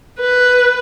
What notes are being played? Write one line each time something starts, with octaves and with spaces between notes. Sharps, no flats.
B4